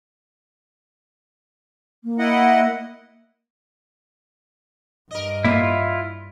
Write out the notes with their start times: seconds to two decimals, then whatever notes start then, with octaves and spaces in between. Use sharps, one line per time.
2.04 A#3
2.19 E4 D#5 F#5
5.11 G2 A#4 D#5
5.45 A2 A#3 E4 F4